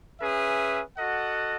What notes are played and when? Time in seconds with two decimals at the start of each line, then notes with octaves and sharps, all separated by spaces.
0.20 C#4 G#4 B4 E5
0.97 F#4 A4 D#5 F#5